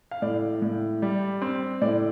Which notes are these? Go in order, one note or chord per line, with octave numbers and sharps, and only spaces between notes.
F5
A2 D5
A2
G3
C4
A2 D5